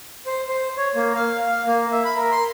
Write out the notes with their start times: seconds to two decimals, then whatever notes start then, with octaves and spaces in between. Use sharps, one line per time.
0.26 C5
0.49 C5
0.77 C#5
0.95 A#3
1.15 F5
1.47 F5
1.66 A#3
1.92 E5
2.05 B5
2.16 A#4
2.32 C6